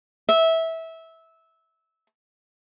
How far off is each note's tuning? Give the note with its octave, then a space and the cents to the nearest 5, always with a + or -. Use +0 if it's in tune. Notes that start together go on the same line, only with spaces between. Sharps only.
E5 -15